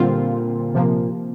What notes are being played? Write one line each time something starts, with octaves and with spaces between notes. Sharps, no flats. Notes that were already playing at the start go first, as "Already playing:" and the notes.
Already playing: A#2 D3 G3 C4 F4
C3 F3 A#3